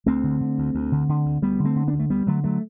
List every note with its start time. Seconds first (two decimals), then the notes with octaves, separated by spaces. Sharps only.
0.06 D2 A3 C4
0.24 D3
0.41 D3
0.58 D2
0.75 D2
0.92 D3
1.09 D3
1.26 D2
1.42 D2 G3 B3
1.59 D3
1.64 A3 C4
1.76 D3
1.88 B3 D4
1.93 D2
1.99 A3
2.10 D2 G3 B3
2.27 D3 F#3 A3
2.44 D3 F#3 A3